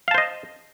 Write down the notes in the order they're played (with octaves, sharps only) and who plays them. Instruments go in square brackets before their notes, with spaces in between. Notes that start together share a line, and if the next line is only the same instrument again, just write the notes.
[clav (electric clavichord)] F5
A5
C5
D#5